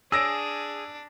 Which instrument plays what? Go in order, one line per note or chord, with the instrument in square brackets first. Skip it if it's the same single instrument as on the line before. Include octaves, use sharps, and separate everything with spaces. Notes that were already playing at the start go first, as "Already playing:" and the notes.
[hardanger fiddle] D4 [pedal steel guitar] G#4 [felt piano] E6 A#6 D7